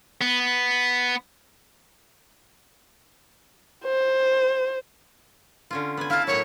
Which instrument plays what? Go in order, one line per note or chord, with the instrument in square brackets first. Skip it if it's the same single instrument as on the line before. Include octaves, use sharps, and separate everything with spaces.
[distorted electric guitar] B3
[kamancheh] C5
[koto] D3 C#4 F4
B3 G#5
[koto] E4 A5 [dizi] F5
[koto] A2 F#3 A#3 [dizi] C#5